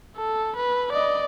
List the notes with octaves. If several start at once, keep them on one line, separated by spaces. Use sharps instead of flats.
A4
B4
D5 D#5